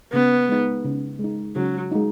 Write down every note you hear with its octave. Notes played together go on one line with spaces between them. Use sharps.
C#3 B3
G#3 D#4
C#3
G#3 D#4
C#3 F#3
G#3 D#4